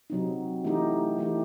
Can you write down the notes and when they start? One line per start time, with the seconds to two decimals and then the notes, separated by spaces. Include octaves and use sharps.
0.10 C3 F#3 C4 D#4
0.64 E3 A3 D#4 G4
1.18 E3 A3 D#4 G4